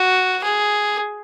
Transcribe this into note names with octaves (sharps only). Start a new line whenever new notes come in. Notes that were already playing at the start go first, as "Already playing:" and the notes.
Already playing: F#4
G#4